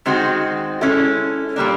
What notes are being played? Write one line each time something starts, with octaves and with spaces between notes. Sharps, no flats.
D#3 G#3 C4 D#4 F#4
G#3 C#4 E4 A4
A#2 G3 A#3 D4